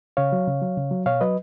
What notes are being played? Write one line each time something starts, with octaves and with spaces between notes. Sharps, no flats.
C#3 C#5 F5
F#3
C#3
F#3
C#3
F#3
B2 C#5 F5
F#3 B4 D#5